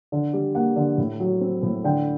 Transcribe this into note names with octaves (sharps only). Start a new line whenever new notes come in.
D3
G3
A#3 F#5
D3
A2
F#3
C4
A2
D3 G5